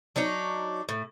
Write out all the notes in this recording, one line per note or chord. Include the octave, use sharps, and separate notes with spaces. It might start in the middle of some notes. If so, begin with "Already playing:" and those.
F#3 D4 D#4 C#5
A2